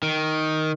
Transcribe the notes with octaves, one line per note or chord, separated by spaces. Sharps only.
D#3